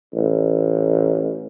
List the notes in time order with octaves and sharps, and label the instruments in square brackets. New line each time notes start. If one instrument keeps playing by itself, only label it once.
[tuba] A1